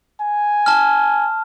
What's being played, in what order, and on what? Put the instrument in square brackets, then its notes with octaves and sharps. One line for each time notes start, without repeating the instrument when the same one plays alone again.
[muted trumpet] G#5
[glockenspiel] A5 F6